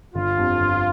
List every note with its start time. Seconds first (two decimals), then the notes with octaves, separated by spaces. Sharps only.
0.14 G1 F4
0.37 F2 D3 G3
0.60 G1